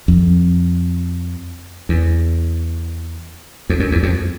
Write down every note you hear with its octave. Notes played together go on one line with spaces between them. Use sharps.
F2
E2
F2
F#2
E2
F2